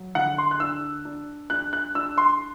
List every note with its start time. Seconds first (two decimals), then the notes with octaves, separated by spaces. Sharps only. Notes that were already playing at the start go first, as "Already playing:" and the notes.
Already playing: F#3
0.15 D3 F#5
0.38 C6
0.51 F#6
0.60 D4 E6
1.05 D4
1.50 D4 F#6
1.73 F#6
1.95 D4 E6
2.18 C6